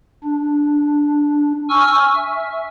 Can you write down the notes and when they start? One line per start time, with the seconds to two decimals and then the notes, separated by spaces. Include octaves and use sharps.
0.24 D4
1.70 G#5 C#6 E6 F6
2.16 E5